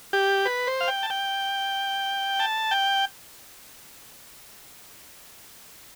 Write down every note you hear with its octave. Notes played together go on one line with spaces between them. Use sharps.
G4
B4
C5
F5
G5
A5
G5
A5
G5